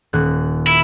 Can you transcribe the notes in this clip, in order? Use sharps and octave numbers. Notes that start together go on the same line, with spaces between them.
D#1 F#6
E4